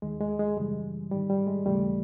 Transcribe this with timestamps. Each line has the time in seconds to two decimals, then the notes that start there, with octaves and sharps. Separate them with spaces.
0.02 D#2 D#3 G#3
0.20 G#3
0.39 G#3
0.57 F#2 C#3 E3 G3
1.11 G#2 D#3 G3
1.30 G3
1.47 G#3
1.65 D#2 C#3 E3 G3 A3